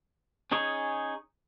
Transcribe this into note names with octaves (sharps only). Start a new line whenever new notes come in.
C#4 D#4 G#4 C#5